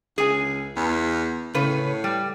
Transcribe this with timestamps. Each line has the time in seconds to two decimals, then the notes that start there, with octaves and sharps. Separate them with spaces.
0.18 C#2 G#4 G#5
0.77 E2
1.55 A2 C#3 B4 C#5
2.04 G3